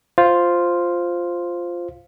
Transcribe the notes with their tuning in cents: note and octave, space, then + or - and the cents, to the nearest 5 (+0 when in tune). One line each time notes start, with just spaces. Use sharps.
F4 +0 C5 +0